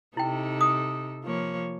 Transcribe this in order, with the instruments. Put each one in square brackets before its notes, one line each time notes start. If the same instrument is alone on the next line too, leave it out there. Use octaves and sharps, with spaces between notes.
[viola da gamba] C3 D#4 A4 [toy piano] E4 G5
[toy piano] D#6
[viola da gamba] F3 A#3 C#5